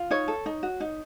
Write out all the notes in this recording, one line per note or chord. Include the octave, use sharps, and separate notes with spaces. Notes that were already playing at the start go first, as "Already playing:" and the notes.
Already playing: F4
D#4 C#5
A4
D#4
F#4
D#4